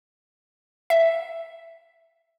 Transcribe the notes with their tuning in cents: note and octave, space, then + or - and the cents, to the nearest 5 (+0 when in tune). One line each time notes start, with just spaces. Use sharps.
E5 +5